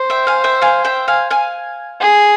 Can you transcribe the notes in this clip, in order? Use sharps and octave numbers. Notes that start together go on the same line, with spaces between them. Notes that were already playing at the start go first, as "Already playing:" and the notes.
Already playing: C5
E5 G5
F5 G#5
E5 G5
F5 G#5
E5 G5
F5 G#5
F5 G#5
G#4